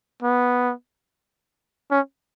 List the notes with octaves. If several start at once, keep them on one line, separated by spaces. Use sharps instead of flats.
B3
C#4